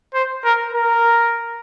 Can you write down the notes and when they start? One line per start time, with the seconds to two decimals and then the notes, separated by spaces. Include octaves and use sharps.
0.14 C5
0.44 A#4
0.73 A#4